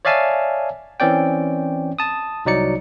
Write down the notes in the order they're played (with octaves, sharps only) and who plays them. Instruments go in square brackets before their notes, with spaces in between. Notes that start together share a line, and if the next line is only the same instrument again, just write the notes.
[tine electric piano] C#5 D5 E5 F5 G#5 A5
E3 C4 C#4 D5 G5
A5 D#6
C2 F#3 D#4 D5 C#7